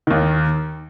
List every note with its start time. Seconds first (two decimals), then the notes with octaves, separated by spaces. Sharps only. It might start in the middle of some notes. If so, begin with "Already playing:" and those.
0.07 D#2 D#3